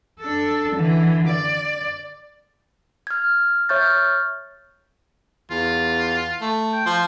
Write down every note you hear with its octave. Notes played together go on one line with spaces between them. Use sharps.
D4 A4
D3 E3
D5
F6 G#6
C#5 E5 C#6 F6 G6 A6
E2 F4
A3
G5
F3 C5